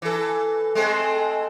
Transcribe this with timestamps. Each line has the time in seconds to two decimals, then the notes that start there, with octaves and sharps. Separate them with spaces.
0.02 E3 A4
0.75 G#3 A3 C4